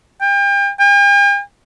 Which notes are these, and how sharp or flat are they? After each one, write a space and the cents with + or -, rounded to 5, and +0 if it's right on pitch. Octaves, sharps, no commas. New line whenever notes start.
G5 +35
G5 +45